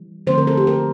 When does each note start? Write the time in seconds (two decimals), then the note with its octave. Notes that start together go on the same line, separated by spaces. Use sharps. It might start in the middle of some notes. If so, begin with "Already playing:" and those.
Already playing: E3 G3
0.27 D3 F3 A3 C4 C5
0.38 A#4
0.47 A4
0.57 G4
0.67 A#4